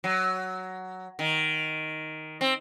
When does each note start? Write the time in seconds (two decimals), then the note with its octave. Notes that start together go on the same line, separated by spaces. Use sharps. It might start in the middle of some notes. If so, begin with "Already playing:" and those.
0.04 F#3
1.19 D#3
2.41 C4